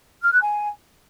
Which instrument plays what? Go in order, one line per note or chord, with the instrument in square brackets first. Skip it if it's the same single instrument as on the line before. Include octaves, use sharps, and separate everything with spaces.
[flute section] F6
F#6
G#5